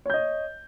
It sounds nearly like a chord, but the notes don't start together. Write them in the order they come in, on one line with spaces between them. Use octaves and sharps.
C#5 G6 D#5